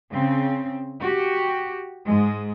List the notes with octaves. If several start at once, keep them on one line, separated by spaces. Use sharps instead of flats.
C#3 C4
F#4 G4
G#2 G#3